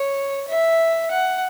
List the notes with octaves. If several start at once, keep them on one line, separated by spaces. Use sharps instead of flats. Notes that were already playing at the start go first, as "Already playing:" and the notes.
Already playing: C#5
E5
F#5